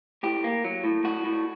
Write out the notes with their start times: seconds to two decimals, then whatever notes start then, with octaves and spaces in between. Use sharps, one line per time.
0.23 A2 G4
0.44 A#3
0.64 F#3
0.84 A2
1.04 A2 F#4
1.24 A2